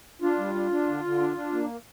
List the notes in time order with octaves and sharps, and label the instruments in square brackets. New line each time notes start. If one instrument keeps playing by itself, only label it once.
[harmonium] D4 F4
G3
D4
D4
D3
D3
D4
D4
A#3